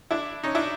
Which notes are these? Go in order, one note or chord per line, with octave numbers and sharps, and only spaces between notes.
D4 E4
C#4 D#4
D4 E4